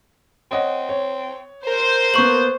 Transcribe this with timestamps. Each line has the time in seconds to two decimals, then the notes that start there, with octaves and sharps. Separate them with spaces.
0.51 C4 C#5 D#5 F#5
0.89 C#5
1.67 A#4 C5
2.14 A#3 B3 C#6 G6 F#7